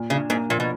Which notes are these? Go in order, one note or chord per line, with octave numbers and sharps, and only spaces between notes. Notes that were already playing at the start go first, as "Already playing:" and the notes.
Already playing: A#2
C#3 D4
G#2 A#3
A#2 F3
B2